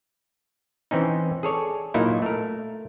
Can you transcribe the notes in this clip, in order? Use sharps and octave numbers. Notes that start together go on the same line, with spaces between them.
E3 C4 C#4 D#4
G#4 A4 C#5 D5
A#2 F#3 A#3 D#4 E4
A3 A#4